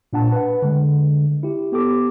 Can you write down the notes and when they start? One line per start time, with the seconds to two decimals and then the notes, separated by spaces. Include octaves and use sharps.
0.13 A#2 D4 F#5 A5
0.32 B4 F#5
0.62 D3 G#3
1.43 E4 G4
1.72 B3 G4 A4 D6